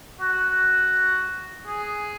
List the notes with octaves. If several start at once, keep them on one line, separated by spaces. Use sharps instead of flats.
F#4
G#4